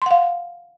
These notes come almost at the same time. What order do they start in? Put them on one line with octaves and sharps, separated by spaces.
C6 F#5 F5